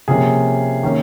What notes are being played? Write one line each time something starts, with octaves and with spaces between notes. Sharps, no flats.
C3 F3 A#3 C#4 G#4
D#3 A#3 C#4